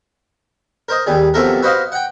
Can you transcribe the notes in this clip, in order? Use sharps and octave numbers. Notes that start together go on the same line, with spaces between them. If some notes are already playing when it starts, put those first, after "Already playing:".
A#4 C5 D#5
D#2 G3 G#4
B1 C3 F3 A3 A4 A#4
F#4 B4 C5 D#5 F5
F#5 G5